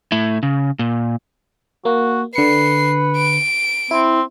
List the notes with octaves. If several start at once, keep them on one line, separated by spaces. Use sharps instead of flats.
A2 E4
C#3
A#2
A#3 F#4
D3 B4 C7 C#7
D7
C4 E4